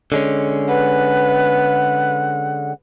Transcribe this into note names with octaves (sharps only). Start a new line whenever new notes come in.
D3 G#3 C#4
B4 F#5